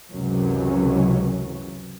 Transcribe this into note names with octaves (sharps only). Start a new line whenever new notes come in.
C#2 F#2 C3 E3 F#3 C#4